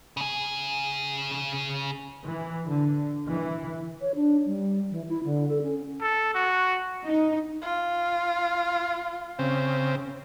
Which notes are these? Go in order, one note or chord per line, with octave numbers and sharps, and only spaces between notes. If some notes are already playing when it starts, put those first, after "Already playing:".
C#3 G#4
E3
D3
E3
C#5
D4
G3
E3
E4
D3
A4
C#4
A4
F#4
D#4
F4
C#3 C4